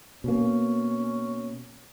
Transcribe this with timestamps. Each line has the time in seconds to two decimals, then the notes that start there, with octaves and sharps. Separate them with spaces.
0.24 B2 A#3 C#4